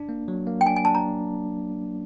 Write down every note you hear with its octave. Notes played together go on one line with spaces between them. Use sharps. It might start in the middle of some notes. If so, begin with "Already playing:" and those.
Already playing: D4
A#3
F#3
A#3
G5
D4 G#5
G#5
D4 A5
A#5